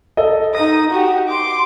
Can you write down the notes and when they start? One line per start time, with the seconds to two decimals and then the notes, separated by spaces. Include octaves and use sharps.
0.17 A4 D#5
0.55 D#4 D#6 A#6
0.91 F#4 G4
1.28 C6 D6